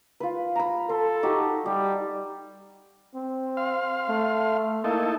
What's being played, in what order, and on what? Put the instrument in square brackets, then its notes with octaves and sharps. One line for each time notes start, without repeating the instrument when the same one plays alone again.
[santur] F4 B4
A#5 B5
[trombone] A4 [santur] C6
[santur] D#4 F#4 G4
[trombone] G3 [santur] G4
[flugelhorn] C4
[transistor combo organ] F5 C6
[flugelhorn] A3
[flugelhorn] A#3 [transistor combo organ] D#4 E4 A4